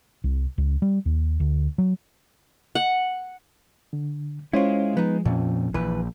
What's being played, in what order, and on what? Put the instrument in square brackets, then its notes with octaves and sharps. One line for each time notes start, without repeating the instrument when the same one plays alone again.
[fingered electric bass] C2
C#2
G3
D#2
D2
F#3
[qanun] F#5
[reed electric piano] D3
[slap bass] G#3 [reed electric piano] C#4 C5 C#5 [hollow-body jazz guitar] E4 F4
[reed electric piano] F3 [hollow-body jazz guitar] B3 D#4
[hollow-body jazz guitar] F2 [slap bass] A#2 C#4
[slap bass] A#1 [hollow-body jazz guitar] E3 B4